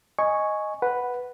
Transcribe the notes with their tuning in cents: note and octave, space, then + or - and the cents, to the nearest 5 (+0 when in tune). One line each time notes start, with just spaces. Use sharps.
D#5 +0 G#5 +0 C#6 +0
B4 +0 F#5 +0